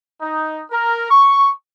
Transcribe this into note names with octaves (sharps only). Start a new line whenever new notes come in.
D#4
A#4
C#6